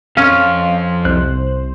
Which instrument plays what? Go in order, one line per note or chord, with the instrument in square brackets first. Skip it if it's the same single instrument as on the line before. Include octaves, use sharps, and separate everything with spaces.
[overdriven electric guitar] F2 F4 [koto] C#4 [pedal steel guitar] F5 F6
[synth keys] C2 C5 [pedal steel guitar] F#6